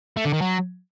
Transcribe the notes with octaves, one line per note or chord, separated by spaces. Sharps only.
A3
D3
D#3
F#3